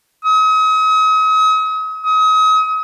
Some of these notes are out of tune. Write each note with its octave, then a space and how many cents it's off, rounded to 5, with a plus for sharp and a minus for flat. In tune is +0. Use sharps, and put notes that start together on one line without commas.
D#6 +40
D#6 +35